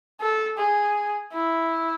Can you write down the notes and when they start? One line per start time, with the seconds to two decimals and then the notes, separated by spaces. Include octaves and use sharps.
0.20 A4
0.58 G#4
1.33 E4